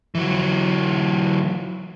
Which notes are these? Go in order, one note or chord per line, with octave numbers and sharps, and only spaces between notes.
E3 F#3